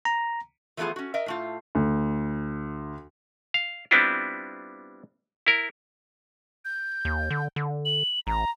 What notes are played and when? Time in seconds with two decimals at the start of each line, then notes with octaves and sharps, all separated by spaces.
0.05 A#5
0.77 E3 F3 A3 B3 F4 G#4
0.96 C#4 F#4
1.14 A#4 D#5 E5
1.26 A2 A3 F4
1.75 D2
3.54 F5
3.91 G3 B3 C4 D4 E4 F4
5.47 E4 A#4
6.65 G6
7.05 D#2
7.30 D3
7.56 D3
7.85 F#7
8.27 A1 A#5